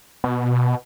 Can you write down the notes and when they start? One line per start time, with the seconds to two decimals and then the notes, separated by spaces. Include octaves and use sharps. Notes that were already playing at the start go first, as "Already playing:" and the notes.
0.24 B2